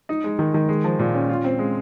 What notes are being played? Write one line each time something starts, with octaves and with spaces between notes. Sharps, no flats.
D#4
G#3
D#3
D#3
G#3
F3
A#2
C#4
F4
C4
G#3